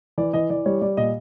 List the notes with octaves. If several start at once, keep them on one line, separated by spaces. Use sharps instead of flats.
E3 D5
E3 D#5
E3 D5
G3 C#5
G3 D5
A#2 D#5